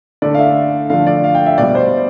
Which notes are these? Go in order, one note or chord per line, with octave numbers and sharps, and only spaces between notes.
D3 A3 D5
F5
E5
D3 F3 A3 F5
D5
F5
G5
E5
B2 G3 D5
C5